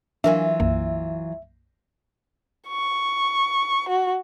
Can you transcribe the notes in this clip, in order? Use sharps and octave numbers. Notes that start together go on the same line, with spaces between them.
E3 F#3 D4 F4 A#4 E5 G#5
B1 F#2 A#3
C#6
F#4